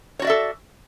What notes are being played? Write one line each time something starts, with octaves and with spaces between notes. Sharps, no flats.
F#4 A4 C#5 D5 E5